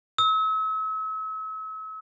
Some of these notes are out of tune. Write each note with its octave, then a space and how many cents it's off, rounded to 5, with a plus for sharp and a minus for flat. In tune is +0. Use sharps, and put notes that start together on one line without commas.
E6 -40